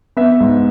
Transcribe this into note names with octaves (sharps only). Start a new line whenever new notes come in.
B3 E5
G#2